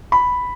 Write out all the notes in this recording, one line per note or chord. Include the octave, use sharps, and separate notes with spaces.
B5